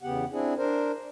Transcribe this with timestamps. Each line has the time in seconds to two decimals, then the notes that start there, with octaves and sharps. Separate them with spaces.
0.03 E2 C#3 B3 G4 F#5
0.31 C4 D4 E4 G#4
0.57 D4 A#4 C5